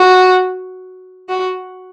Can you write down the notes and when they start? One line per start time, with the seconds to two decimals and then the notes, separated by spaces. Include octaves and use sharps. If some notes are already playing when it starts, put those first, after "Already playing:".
Already playing: F#4
1.29 F#4